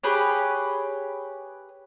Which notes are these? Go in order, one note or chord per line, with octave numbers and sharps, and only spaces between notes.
G4 G#4 B4 C#5